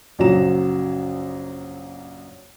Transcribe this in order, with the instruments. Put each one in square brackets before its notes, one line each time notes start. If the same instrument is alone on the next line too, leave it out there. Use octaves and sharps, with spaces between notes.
[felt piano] A#1 F#2 C#3 F#3 A#5 E7